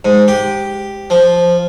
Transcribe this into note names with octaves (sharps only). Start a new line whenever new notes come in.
G#2
G4
F3